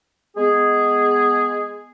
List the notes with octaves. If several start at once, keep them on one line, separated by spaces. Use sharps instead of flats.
G#3 B3 G#4